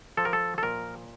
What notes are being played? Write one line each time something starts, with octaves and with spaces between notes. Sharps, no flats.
F3 A4
A#4
A4
A4
A#2 A#4